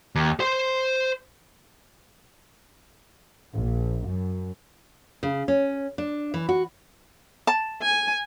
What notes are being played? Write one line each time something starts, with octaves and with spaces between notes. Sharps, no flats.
D#2
C5 C6
A#1
F#2
C#3
C#4
D4
E3
F#4
A5
G#5